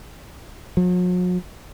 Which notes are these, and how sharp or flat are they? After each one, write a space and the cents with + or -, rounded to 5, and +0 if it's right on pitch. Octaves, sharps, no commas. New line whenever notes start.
F#3 -45